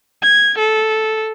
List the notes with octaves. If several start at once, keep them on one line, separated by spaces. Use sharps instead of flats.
G#6
A4